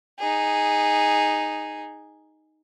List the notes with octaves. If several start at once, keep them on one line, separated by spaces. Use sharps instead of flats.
D#4 G#4